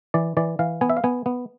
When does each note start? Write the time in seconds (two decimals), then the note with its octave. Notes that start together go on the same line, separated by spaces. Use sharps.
0.14 E3 D5
0.37 E3 D5
0.59 E3 F5
0.81 B3 G#5
0.90 E5
0.97 F5
1.04 B3 G#5
1.26 B3